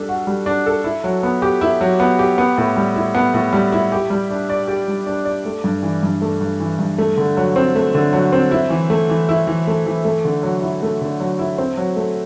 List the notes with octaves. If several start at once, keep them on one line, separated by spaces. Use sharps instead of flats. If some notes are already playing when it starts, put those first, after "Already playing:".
Already playing: G3 D4 A4
F#4
G3
D4
A4
E4
F#3
B3
G4
E4
F#3
B3
G4
B3
A2
G3
E4
B3
A2
G3
E4
G4
G3
D4
D5
G4
G3
D4
D5
A3
G2
E3
G2
A3
G2
E3
G2
A3
D3
F#3
C4
A3
D3
F#3
C4
E4
E3
A3
E3
E4
E3
A3
E3
A3
D3
F#3
E4
A3
D3
F#3
E4
C4
F#3
A3